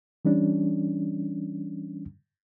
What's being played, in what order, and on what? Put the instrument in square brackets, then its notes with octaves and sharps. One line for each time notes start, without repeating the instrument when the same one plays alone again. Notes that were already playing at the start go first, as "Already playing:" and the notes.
[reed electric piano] E3 G3 C#4 D4